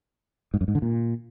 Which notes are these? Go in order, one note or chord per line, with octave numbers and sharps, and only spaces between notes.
G#2
F#2
G#2
D3
A#2